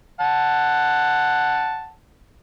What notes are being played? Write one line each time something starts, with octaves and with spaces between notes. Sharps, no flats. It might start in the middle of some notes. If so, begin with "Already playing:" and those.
F#5 A5